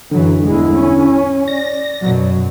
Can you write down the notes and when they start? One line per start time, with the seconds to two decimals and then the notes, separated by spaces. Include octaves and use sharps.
0.11 F#2 D3 E3 F#3
0.46 G1 E2 G#3 E4
0.77 C#4
1.48 D5 A#6
2.03 F#2 B2 F#3